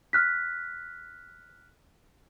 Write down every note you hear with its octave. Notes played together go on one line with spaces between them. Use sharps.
F6 F#6 B6